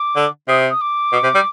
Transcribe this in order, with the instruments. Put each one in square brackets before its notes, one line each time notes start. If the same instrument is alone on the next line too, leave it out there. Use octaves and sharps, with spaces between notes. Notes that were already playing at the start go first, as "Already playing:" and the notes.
Already playing: [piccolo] D6
[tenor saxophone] D3
[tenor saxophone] C3 [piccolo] D#6
[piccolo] D#6
D6
[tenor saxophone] B2
C3
G3